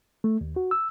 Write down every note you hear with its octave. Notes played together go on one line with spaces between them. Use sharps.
A3
D#2
F#4
E6